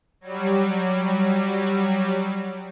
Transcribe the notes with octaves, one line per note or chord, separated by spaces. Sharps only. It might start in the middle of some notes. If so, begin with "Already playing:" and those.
F#3 G3